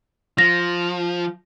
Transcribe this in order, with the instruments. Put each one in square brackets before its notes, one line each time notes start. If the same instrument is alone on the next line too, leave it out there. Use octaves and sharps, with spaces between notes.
[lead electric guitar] F3 [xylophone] A#6